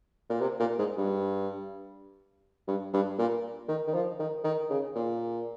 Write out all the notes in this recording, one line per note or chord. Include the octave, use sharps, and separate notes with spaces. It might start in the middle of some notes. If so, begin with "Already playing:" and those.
A#2
C3
A#2
G#2
G2
G2
G2
A#2
D#3
D#3
F3
D#3
D#3
C#3
A#2